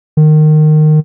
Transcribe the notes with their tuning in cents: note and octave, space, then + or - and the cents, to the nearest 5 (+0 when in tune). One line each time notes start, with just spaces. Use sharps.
D#3 -20